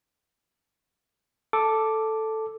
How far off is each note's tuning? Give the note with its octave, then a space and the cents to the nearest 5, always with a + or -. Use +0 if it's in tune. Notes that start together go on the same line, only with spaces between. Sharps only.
A4 +0 D6 +0